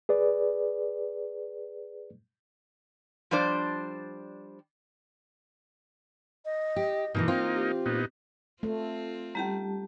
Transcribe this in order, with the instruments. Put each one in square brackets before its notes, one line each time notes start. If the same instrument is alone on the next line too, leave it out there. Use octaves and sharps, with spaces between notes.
[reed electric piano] G#4 B4 D5
[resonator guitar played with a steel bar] F3 G3 D4 C5 D5
[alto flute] D#5
[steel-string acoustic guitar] G4
[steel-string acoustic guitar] B2 D#3 E3 [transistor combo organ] A#3 D#4
[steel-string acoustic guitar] C4 F4
[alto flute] G4
[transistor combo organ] A#2 B3 D#4
[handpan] A3 [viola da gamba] C4 F4
[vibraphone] G3 G4 A5 [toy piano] C#4 D#4 A#5